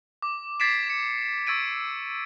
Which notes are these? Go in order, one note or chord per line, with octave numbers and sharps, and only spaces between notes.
D6
G#6 A6 B6 C7 D7 E7
C#7
C#6 E6 G#6 A6 D7 D#7